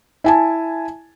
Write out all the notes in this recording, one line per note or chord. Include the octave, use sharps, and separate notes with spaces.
E4 G#5 A5